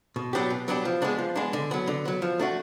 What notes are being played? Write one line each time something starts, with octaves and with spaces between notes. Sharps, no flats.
B2
F#3 B3 D4 G4
B2
F#3 B3 D4 G4
F3
G#3 B3 D4
F3
G#3 B3 D4
D3
F#3 B3
D3
F#3 B3
F3
A3 D4 F#4